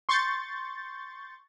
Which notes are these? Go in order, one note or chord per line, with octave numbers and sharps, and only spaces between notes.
C6 C#6 G6 A6